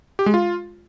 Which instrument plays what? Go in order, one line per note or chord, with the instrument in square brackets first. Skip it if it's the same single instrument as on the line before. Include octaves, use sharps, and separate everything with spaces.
[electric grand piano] G4
G#3
F4